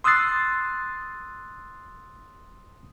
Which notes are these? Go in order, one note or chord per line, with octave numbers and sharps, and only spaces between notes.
C6 D#6 E6 F#6 A6 C7